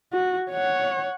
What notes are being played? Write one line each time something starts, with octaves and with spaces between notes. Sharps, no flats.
F#4
C#5 F#5